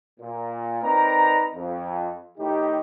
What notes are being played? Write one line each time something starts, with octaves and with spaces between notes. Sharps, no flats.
A#2
C4 D#4 A#4 B4 D5 A#5
F2
A2 D#3 D#4 G4